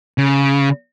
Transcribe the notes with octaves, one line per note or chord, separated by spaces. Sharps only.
C#3